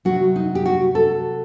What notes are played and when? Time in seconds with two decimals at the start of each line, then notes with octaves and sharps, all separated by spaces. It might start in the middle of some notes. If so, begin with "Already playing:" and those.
0.05 C3 F#3 F#4
0.36 D#4
0.55 G4
0.66 F#4
0.95 A4